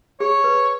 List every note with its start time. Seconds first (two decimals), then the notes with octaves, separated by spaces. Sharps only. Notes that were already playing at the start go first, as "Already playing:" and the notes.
0.20 G#4 C#5
0.44 B4